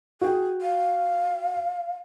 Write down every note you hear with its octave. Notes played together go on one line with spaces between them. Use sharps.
F#4 G#4 G5
F5